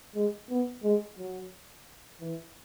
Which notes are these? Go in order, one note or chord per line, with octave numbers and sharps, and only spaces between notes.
G#3
B3
G#3
F#3
E3